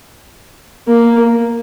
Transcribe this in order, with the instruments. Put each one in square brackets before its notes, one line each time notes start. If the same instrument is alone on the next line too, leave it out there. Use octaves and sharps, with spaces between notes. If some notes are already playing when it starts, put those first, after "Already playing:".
[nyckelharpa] A#3